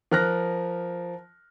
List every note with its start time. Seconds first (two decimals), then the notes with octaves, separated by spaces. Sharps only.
0.11 F3 A#4 F6 F#6 A#6